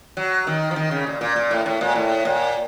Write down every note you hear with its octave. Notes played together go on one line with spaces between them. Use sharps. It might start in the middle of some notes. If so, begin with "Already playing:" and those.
F#3
D#3
F3
D#3
C#3
A#2
A#2
A#2
A2
A2
A#2
A2
A#2